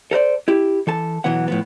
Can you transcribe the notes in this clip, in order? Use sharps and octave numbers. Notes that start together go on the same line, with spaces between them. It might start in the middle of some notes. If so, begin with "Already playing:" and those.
A4 A#4 C5 D5
E4 G4
E3 A4 A5
B1 C3 E3 F#3 B3 F#5
A2 F3 B3